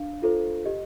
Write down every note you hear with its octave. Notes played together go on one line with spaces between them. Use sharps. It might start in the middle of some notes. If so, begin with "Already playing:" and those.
Already playing: D4 F5
F4 A4 C5
G4 D#5